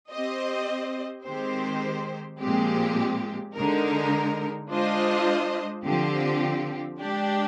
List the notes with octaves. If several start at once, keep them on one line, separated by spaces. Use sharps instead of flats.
C4 G4 C5 D#5
D#3 G#3 C4 G4 C5
A#2 F3 G#3 C4 G4
D3 G#3 D#4 A#4
G#3 D4 F4 C5 D#5
D3 F3 C4 G4
G#3 D4 G4 D5